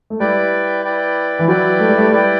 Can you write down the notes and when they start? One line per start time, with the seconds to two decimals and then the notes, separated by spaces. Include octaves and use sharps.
0.10 A3
0.20 G3 E4 B4 D5 G5
0.84 E4 B4 D5 G5
1.39 E3
1.48 F#3 E4 B4 D5 G5
1.79 A3
1.89 G3
1.97 A3
2.11 G3 E4 B4 D5 G5